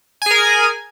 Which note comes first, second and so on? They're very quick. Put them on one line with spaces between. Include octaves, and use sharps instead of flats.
G#5 G#4 A#4